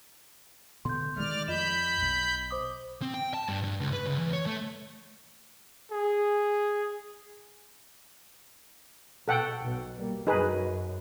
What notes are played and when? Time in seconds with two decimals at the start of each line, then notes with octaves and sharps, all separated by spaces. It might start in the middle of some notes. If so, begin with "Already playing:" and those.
0.85 B2 D3 C6 G6
1.16 D#3 G#3 A3 D5 F6
1.48 F2 F4 D#5 B5 G6 E7
2.02 B1
2.51 C5 D6 D#6
3.02 C4
3.14 G5
3.34 A5
3.48 G2
3.63 G2
3.80 C#2
3.93 B4
4.06 C#2
4.18 E2
4.33 C#5
4.46 A3
5.92 G#4
9.28 B2 A4 F#5 G5
9.61 B1 B2
9.95 G3 A#3
10.27 F#2 F#3 D#4 G#4 B4